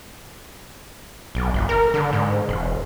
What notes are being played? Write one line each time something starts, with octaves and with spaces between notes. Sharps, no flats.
B1
G1
A#4
D3
G#2
E1